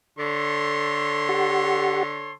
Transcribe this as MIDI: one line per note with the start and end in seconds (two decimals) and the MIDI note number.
0.18 2.34 50
0.18 2.33 69
0.18 2.33 73
0.18 2.33 84
1.29 2.03 67
1.29 2.03 78